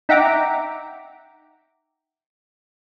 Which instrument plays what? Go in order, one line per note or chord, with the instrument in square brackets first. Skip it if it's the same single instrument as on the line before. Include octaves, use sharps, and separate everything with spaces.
[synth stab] D#4 E5 F#5 G5 A#5 D6